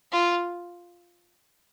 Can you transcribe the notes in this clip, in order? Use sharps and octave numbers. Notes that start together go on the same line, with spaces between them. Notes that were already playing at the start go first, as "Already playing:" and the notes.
F4